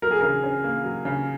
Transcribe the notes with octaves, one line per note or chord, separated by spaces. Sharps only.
F#3 A#4
G#4
C#3 A#4
C#4
A#3
F#3
C#3